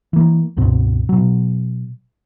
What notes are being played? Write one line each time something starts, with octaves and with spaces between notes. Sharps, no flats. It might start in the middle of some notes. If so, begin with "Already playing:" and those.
E3 A#3
C#2 G2 B2 C4
B2 F#3